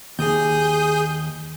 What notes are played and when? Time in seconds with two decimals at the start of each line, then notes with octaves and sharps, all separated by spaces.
0.19 D#2 G#4 D#6 G6